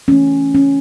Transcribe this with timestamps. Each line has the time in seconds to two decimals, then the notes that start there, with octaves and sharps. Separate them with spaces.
0.08 E3 A3 C#4
0.55 C#4